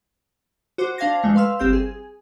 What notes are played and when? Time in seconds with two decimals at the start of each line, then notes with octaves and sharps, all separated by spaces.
0.78 F#4 C5 D6 F#6
0.98 D4 C5 F5 A5 G#6 A#6
1.23 F2 G#3 A3 D4
1.35 B4 F5 C6 E6 F6
1.59 G1 C4 G4 C5 G6 E7
1.73 G#4